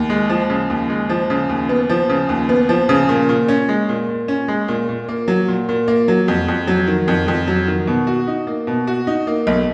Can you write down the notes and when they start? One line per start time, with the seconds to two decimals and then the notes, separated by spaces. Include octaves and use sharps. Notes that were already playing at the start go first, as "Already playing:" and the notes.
Already playing: D#2
0.10 G#3
0.29 F3
0.50 C#3
0.70 D#2
0.90 G#3
1.09 F3
1.30 C#3
1.49 D#2
1.69 B3
1.89 F3
2.09 C#3
2.29 D#2
2.49 B3
2.69 F3
2.89 C#3
3.09 A#2
3.29 A#2
3.48 C#4
3.69 G#3
3.89 A#2
4.09 A#2
4.28 C#4
4.48 G#3
4.68 A#2
4.89 A#2
5.08 A#3
5.28 F#3
5.48 A#2
5.69 A#2
5.88 A#3
6.08 F#3
6.28 F2
6.48 F2
6.67 F#3
6.87 D#3
7.08 F2
7.28 F2
7.47 F#3
7.67 D#3
7.87 B2
8.07 F#4
8.28 D#4
8.47 A#3
8.67 B2
8.87 F#4
9.07 D#4
9.27 A#3
9.47 B1